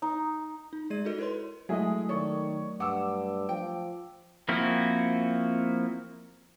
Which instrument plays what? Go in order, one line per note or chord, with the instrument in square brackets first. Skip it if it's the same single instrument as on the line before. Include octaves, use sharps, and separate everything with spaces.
[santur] D#4
[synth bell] D#4
G#3 G#4 D5 G#6 D#7
D#4 F#4 A4 A#4 D#5
E4 A#4 B4 C#5 C6
[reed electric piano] F#3 A3 D#5 [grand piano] G#3 E4 G#4
[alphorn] D#3 [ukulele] A4 [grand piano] C#5 D5 C#6
[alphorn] G2 [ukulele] F#5 [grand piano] D6 E6
[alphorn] F3 [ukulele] G5
[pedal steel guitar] F3 A#3 C4 E4 F#4